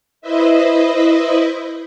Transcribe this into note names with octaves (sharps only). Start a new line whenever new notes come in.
E4 B4 C5 D#5 E5